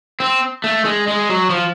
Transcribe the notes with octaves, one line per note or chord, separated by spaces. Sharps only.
C4
A3
G#3
G#3
F#3
F3